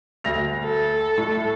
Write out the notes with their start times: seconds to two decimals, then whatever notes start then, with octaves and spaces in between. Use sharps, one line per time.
0.24 D2 A#6 F7
0.64 A4
1.18 A2